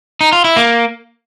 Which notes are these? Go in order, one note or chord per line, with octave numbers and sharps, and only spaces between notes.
D#4
F4
E4
A#3